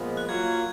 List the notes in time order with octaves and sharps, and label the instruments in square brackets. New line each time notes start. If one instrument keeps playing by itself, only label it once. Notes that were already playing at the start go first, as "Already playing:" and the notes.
Already playing: [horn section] A#2 F3 G#3 B3
[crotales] F#6
[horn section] F#3 A#3 F4 [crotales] G#6